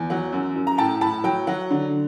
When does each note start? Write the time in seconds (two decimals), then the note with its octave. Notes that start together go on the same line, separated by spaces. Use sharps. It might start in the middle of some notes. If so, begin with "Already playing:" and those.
Already playing: E2
0.10 F#3 F#5
0.33 F#2
0.56 F#2
0.67 A#5
0.78 A2 G5 A5
1.01 A2 A5 B5
1.24 F#3 G5
1.47 F#3 F#5
1.70 D3